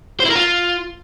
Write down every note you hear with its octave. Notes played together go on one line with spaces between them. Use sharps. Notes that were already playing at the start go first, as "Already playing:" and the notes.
C5
E4
A#4
F4